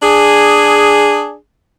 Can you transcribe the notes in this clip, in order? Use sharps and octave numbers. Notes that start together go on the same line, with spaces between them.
D4 G#4